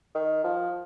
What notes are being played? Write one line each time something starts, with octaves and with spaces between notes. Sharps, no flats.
D#3
F3